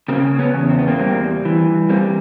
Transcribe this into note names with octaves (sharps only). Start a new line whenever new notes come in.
C#3 A#3 C4
B3 C#4
E2
C4
B3
A#3 C4
G3
E3
G3 A#3 C4